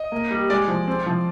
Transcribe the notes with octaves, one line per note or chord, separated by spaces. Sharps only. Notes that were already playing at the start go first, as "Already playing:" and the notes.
Already playing: D#5
A#3
G3
G#3 D5
F3
C4
F3